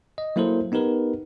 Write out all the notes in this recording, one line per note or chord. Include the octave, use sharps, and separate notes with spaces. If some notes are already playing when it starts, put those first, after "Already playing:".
D#5
F#3 A#3 E4 A4 A#4 C5
B3 D#4 G4 A#4 B4